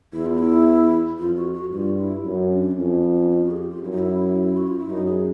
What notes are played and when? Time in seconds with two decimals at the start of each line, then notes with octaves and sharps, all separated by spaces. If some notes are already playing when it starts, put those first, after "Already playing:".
0.13 E2 E4
0.26 F4
0.38 E4
1.19 F2 F4
1.36 F#4
1.54 F#4
1.72 G2 F4
1.98 E4
2.25 F#2 C#4
2.51 D4
2.71 C4
2.77 F2 C#4
3.13 C#4
3.31 F4
3.44 F#4
3.51 G#4
3.56 G4
3.70 F4
3.83 F#2 E4
3.91 D#4
3.98 E4
4.57 F#4
4.67 F4
4.79 E4
4.89 F#2 D#4
5.07 G#4